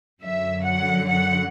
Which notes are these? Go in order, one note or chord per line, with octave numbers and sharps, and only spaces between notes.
F#2 D3 F#3 E5
F#5
F#5